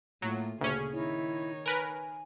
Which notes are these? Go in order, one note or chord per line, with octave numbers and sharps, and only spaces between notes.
A2 F#3 A#3 F4
D2 A#2 C#3 C#4 G#4
D#3 D#4 E4 C#5
A#4 B4 G#5